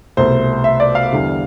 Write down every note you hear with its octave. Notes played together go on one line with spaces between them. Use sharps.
C2 B2 A3 C5
E5
D5
F5
E2 D3 G3